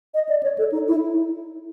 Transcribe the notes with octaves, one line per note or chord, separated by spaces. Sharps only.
D#5
D5
C#5
A4
D#4
E4